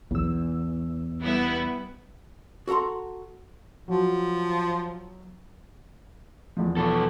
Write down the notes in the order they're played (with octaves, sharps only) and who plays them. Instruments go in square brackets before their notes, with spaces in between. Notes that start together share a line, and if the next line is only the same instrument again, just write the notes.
[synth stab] B1 E6 [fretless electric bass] E2
[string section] G3 B3 E4
[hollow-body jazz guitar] F#4 A4 F#5 A#5 C6
[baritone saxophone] F3 [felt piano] F#3
[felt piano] E2 F3
[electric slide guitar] B2 A4